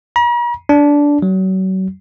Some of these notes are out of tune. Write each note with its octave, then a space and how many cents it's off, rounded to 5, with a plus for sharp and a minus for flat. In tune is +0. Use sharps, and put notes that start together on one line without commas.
A#5 +45
D4 -15
F#3 +35